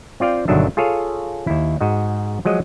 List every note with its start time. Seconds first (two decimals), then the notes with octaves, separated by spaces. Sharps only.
0.20 C4 F4 D5 F5 G5
0.48 G1 B2 D#3 F#3 D4 E5
0.77 F4 G#4 A4 C#5 F5
1.47 D#2 E4
1.81 G#2 F#4 D#5
2.45 F3 F#3 G#3 D#5